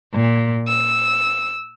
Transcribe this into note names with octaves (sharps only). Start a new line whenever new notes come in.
A#2
E6